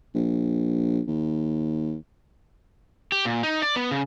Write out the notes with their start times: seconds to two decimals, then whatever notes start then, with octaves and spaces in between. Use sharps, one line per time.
0.15 A#1
1.08 D#2
3.12 G4
3.25 A#2
3.43 D#4
3.62 D5
3.76 B3
3.91 C#3